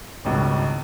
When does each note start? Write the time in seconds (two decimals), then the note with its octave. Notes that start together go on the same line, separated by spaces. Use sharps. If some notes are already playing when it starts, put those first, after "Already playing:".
0.25 G#1 C#2 G2 B2